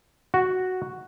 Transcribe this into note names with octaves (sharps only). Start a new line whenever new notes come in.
F#4